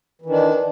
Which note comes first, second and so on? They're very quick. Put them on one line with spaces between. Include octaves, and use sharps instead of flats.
E3 D#3 D4